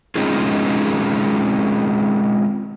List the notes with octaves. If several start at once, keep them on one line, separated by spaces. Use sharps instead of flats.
G#3 C4 C#4 D#4 F4 G#4